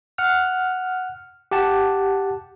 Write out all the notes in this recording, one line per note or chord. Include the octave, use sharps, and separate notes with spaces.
F#5 F6
G4 F#5 A5